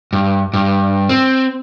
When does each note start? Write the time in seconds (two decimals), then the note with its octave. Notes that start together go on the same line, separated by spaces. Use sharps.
0.13 G2
0.54 G2
1.09 C4